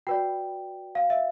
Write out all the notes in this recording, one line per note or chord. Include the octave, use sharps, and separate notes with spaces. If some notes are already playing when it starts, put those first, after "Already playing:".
F#4 B4 D5 G5
F5
E5